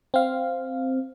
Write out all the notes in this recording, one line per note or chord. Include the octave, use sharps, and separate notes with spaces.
C4 F5